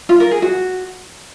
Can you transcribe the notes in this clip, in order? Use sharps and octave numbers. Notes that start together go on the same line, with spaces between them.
F4
A#4
G#4
F#4